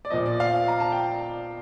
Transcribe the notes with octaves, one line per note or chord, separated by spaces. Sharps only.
D5
A#2 F3 D#5
D5
F5
A#5
A5
G5